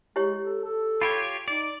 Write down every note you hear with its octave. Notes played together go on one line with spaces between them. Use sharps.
G#3 E4 G4 C#5
A4
A4
F4 G4 C#5 B5
D#4 D5